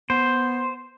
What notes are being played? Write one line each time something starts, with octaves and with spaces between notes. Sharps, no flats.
B3 C5